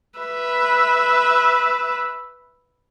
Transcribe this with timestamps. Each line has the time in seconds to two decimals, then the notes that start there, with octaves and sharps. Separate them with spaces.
0.19 B4 E5